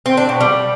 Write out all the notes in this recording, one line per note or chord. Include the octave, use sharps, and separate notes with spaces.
C4
D4
B2
G3